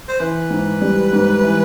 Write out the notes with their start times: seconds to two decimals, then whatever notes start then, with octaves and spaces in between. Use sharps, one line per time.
0.09 C5
0.20 E3 B4
0.50 G#2
0.81 G3
1.13 G#2
1.43 E3